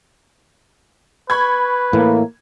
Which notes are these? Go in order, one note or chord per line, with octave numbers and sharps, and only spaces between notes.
B4 B5 C#6 G#6
A2 E3 A#3